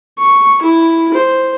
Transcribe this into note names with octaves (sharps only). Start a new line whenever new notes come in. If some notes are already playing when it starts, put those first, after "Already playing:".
C#6
E4
C5